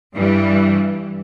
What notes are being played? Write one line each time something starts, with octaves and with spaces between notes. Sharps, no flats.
G2 E3 G3